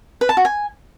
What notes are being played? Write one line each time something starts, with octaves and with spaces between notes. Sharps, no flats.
B4
A5
F#4
G#5